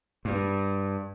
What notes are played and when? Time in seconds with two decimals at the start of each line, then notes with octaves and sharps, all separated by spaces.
0.25 G2